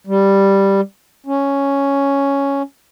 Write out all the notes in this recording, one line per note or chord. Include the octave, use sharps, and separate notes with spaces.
G3
C#4